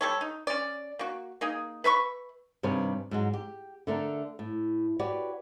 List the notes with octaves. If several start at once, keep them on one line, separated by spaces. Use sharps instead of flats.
G3 A4 C#5
D#4
C#4 D5
A#3 F#4
A#3 D#4 G#4
B4 E5 B5 C#6
G2 C3 D#3 B4 C#5 G#5
G#2 F#3 G#3
G4
D3 A3 D4 A#4
A2
F#4 G4 B4 C#5 D5